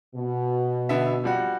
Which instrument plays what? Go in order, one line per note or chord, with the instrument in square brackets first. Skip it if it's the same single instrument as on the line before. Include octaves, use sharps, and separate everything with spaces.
[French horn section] B2
[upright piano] D3 B3 E5
F3 G3 F#4